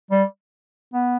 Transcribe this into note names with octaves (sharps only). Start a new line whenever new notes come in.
G3
B3